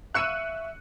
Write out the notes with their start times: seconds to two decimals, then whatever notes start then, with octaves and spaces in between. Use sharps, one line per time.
0.14 E5 F5 C#6 E6 F#6 C#7 D#7